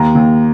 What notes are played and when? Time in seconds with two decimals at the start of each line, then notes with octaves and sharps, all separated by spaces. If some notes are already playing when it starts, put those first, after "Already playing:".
Already playing: D#2 A#5
0.15 D#2